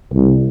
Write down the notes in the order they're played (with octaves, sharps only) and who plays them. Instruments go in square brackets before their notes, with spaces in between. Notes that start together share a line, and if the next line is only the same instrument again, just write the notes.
[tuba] C2